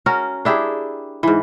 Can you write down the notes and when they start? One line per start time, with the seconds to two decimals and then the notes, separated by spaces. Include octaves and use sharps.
0.06 C#4 F#4 A#4
0.45 D4 E4 G4 G#4
1.23 G#2 E3